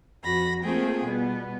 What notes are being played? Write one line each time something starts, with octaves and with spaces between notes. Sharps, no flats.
F2 F#4 B5 A#6
A3 A#3 C4 F4 G#4 G5
B2 G3 B3